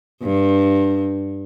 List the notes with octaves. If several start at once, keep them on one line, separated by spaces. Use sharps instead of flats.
G2